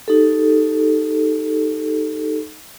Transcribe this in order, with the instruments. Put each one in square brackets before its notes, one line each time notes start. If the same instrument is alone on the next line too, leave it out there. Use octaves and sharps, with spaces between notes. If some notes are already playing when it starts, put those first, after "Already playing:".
[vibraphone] D#4 G4 A4